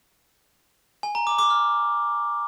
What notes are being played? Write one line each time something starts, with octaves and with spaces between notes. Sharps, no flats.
G#5
A#5
D6
D6
F6